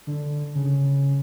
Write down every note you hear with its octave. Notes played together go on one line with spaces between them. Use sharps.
D3
C#3